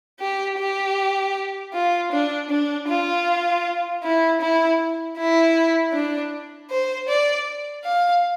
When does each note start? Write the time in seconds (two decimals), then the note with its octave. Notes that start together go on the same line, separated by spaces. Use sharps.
0.21 G4
0.59 G4
1.74 F4
2.12 D4
2.50 D4
2.88 F4
4.03 E4
4.41 E4
5.17 E4
5.93 D4
6.71 C5
7.09 D5
7.85 F5